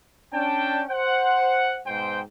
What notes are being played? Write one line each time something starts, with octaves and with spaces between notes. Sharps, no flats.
C#4 D4 G5 A5
C5 F#5
G#2 B2 C5 G5